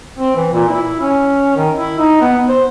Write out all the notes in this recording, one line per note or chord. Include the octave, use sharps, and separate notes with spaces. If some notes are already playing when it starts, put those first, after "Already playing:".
C4
E3
A#2
E4
C#4
D#3
E4
D#4
B3
C5